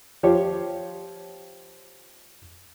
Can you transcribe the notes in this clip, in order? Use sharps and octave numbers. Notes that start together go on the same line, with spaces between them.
F3 F4 G4 C#5